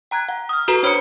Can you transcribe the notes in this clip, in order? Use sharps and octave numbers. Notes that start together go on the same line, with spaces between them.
G5 A#5 F#6 G#6
F#5
D#6 F6
F#4 A4 B4 A#5
D4 C5 C#5 B5 D#6 C#7